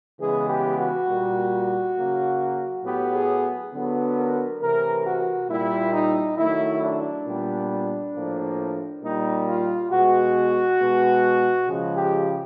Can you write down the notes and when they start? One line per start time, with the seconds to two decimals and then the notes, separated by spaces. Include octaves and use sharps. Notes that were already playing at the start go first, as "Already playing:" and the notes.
0.20 C#3 E3 G#3 B3 G#4
0.49 G4
0.79 F#4
1.08 A#2 G3 A#3
1.96 C#3 F#3 A#3
2.85 A2 F#3 B3 G4
3.14 G#4
3.73 D3 F#3 B3
4.17 A#4
4.61 C3 E3 A3 A#4
5.05 F#4
5.49 A#2 G3 A#3 E4
5.93 D#4
6.38 D#3 F#3 A3 E4
6.82 D4
7.26 A#2 G3 B3
8.14 A2 F3 A#3
9.02 A#2 G3 A#3 D#4
9.46 F4
9.90 B2 G#3 B3 F#4
10.79 B2 G#3 B3
11.67 C#3 F3 G#3 G#4
11.96 G4